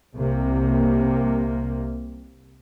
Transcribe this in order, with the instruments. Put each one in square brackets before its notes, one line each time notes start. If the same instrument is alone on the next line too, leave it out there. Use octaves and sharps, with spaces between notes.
[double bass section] C2 C3 A#3